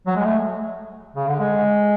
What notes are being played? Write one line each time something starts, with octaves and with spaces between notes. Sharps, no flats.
F#3
G#3
A3
C#3
D3
G#3